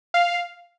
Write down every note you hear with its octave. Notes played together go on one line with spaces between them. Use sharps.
F5